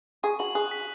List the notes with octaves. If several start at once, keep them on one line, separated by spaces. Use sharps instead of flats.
G#4 C#6
F#4 F#7
G#4 F#6
B6